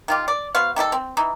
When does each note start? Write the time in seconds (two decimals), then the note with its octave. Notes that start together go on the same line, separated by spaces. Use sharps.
0.08 D#3 F4 G4
0.28 D5
0.55 B3 F#4 C5 F5
0.76 D#3 G3 G4 A4
0.92 C4
1.17 E3 D#4